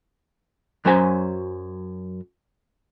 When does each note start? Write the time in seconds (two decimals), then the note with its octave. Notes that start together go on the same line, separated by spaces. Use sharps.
0.85 F#2 F#3 C#4 C5 G#5 A#5